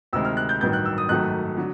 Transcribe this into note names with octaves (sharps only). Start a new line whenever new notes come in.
D2 C3 D#3 G#3 E6
F6
F#6
G6
A1 G2 D#3 F#3 G6
F#6
E6
D#6
G#1 F#2 D#3 F#3 A3 F#6
D3 F#3